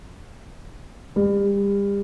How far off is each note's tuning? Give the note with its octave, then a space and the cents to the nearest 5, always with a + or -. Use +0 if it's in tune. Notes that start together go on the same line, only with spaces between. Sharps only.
G3 +35